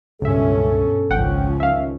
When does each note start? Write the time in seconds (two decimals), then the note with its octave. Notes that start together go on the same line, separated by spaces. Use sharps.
0.22 C#2 G2 B2 C#4 A4 E5
1.10 G#1 C#2 F3 C#4 F#5 G5
1.60 D#3 E5 F5